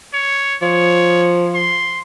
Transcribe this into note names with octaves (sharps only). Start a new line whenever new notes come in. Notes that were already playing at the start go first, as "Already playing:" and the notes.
C#5
F3 C#5
C6